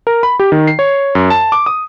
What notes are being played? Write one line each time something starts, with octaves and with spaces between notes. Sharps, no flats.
A#4
B5
G4
D#3
C7
C#5
F#2
A5
D6
D#6